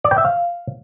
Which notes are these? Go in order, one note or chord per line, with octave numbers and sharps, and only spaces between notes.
D5
G5
E5
F5